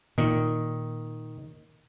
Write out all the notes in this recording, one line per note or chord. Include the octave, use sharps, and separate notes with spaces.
A#2 D#3